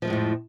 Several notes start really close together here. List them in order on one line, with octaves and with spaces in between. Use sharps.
F3 A3 G#3 A2 F2